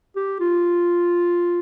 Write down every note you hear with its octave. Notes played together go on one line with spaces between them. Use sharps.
G4
F4